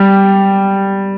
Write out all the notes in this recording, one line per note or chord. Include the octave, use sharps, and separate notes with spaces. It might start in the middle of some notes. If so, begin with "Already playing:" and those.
Already playing: G3